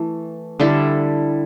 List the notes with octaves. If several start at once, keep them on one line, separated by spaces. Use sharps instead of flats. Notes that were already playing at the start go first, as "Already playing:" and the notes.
Already playing: E3 A3
D3 G3 E4 A4